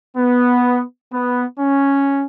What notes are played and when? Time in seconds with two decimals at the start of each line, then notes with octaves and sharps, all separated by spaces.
0.17 B3
1.13 B3
1.60 C#4